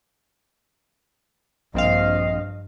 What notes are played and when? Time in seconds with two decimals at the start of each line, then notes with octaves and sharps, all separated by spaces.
1.74 A#1 G2 C4 D#5 F5